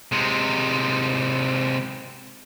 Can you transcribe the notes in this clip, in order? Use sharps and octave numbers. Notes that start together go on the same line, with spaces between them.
C3 G#3